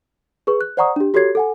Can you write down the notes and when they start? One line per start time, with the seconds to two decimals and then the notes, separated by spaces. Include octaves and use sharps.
0.47 G#4 B4 C#6
0.61 F#6
0.77 C5 D5 F#5 A#5 C#6 D#6
0.96 D4 G4
1.14 F#4 G4 A4 C#5 G#6 C7
1.35 A4 F#5 G#5